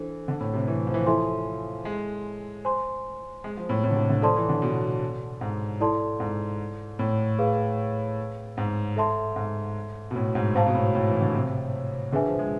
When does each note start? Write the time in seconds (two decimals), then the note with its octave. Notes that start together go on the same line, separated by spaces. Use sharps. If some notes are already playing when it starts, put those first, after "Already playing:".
Already playing: E3 D4 A4 C5
0.28 D3
0.40 A2
0.54 C3
0.68 E3
0.87 F3
0.94 E3
1.01 F3
1.06 E4 A4 E5 G#5 C6
1.85 G#3
2.65 C5 G#5 C6
3.44 G#3
3.57 F3
3.69 A2
3.84 A2
3.91 D3
3.96 C3
4.10 D3
4.22 F3 A4 D5 A5 C6
4.36 E3
4.49 D3
4.62 B2
5.41 G#2
5.80 E4 A4 D5 A5 C6
6.20 G#2
6.99 A2
7.39 G#4 B4 F5
8.57 G#2
8.96 A4 E5 A5 C6
9.36 G#2
10.11 B2
10.16 A2
10.35 G#2
10.55 G#2 C5 F5 A5
10.67 B2
10.74 A2
10.95 A2
11.08 E3
11.21 D3
11.34 C3
12.12 D3 D4 G#4 B4 E5 G#5
12.26 F3
12.39 G#3